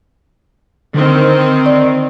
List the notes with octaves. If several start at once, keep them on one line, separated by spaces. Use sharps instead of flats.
D3 D#3 C4
D5